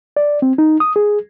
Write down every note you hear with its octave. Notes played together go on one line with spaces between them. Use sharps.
D5
C4
D#4
D#6
G#4